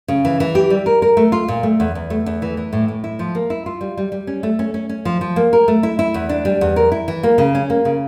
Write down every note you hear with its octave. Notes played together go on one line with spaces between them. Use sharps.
C#3
E3
E3
G4
G3
A#4
A#4
A3
F4
A#2
A3
E2
E2
A3
E2
E3
E3
A2
A2
E4
F3
A#3
E4
F4
G3
G3
G3
C#4
A3
C#4
C#4
C#4
F3
F3
A#3
A#4
A3
E4
E4
E2
D4
G3
E2
A#4
E4
E3
A#3
C#3
C#4
A#3
C#3